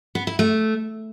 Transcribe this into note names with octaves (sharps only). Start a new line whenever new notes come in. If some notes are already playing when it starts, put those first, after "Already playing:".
B3
E4
A3